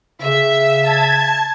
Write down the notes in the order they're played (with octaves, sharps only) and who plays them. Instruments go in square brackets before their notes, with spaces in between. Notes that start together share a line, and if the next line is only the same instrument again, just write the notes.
[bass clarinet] C#3 [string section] E5
[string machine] A5 G#6